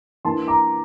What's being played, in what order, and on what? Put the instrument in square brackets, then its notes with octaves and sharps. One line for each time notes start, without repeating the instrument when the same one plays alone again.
[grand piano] E3 A#3 D4 A5 C6
A#5 D6